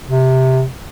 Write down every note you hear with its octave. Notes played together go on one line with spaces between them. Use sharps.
C3